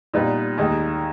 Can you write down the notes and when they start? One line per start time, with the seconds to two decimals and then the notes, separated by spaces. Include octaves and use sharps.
0.14 A#2 G3 B3 D#4
0.58 D#2 D#3 G#3 D#4